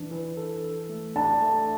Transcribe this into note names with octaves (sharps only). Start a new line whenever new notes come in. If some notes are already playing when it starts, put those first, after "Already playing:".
Already playing: E3 D4
E3
A4
A4
A3
D4 A5
A3